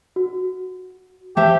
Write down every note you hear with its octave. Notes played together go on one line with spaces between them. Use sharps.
F#4
G4 C5 E5 A5